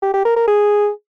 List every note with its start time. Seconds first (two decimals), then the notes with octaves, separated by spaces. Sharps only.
0.02 G4
0.14 G4
0.25 A#4
0.36 A#4
0.48 G#4